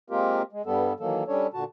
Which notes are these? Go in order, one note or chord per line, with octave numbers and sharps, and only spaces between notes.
G#3 A#3 C4 F4 G4 A#4
G#3
G2 G3 B3 A4
D#3 E3 F#3 A#3 A4
G3 C#4 D4 A4 C#5
A#2 D3 F#4 A5